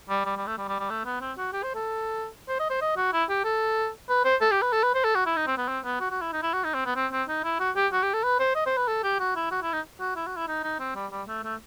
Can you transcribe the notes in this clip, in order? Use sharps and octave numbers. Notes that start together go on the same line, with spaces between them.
G3
G3
G3
A3
G3
G3
G3
A3
B3
C4
F#4
G4
C5
A4
C5
D#5
C5
D#5
F#4
E4
G4
A4
B4
C5
A4
G4
B4
A4
B4
C5
A4
F#4
E4
D#4
C4
B3
C4
B3
F#4
F#4
E4
D#4
E4
F#4
D#4
C4
B3
C4
C4
D#4
E4
F#4
G4
F#4
G4
A4
B4
C5
D#5
C5
B4
A4
G4
F#4
E4
F#4
E4
D#4
F#4
E4
F#4
E4
D#4
D#4
C4
G3
G3
A3
A3